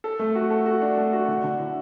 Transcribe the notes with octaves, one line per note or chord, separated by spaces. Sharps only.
A4
A3
F#4
A4
F#4
D4
A3
F#4
D3
D3
E4